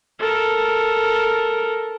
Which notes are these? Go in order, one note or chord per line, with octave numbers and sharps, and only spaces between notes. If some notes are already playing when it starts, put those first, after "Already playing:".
A4 A#4